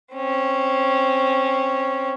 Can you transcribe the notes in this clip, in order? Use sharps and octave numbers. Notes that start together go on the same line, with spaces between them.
C4 C#4